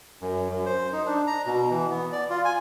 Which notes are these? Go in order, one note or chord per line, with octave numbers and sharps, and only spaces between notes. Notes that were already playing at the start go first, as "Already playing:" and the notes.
F#2
F#2
C5
D#4
D4
A#5
B2
E3
B3
D5
F4
G#5